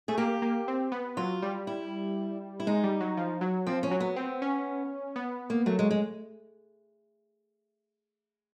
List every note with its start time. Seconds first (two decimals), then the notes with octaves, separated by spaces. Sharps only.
0.08 A3 G#4
0.18 A#3 G4
0.42 A#3
0.68 C4
0.92 B3
1.17 F#3 F4
1.42 G3
1.67 E4
2.60 E4
2.67 G#3 D#4
2.84 G3
3.01 F#3
3.17 F3
3.41 F#3
3.67 F3 C4
3.83 C#4
3.91 F#3
4.00 B3
4.16 C4
4.42 C#4
5.16 B3
5.50 A#3
5.66 F#3 A3
5.79 G#3
5.91 G#3